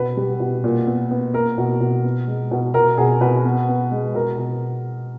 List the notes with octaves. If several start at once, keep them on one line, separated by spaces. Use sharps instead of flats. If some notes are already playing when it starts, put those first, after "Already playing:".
Already playing: B2 B4
G3
B2
A#2
B3
B3
A#3 A#4
B2
B2
B3
G#3
B2
B2 A#4
B2 G#4
B2 B4
B3
B3
G#3
B2 A#4
B2